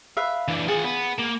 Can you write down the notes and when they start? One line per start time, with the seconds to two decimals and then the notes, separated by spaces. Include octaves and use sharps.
0.17 B4 E5 F5
0.48 E3 D4
0.68 F4 G#4 F#5
0.84 B3
1.18 A#3